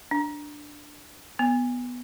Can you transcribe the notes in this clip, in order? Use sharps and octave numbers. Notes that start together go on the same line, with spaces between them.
D4
B3